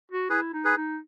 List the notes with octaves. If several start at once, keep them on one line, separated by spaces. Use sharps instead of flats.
F#4
E4 G#4 B4
D#4
G#4 B4
D#4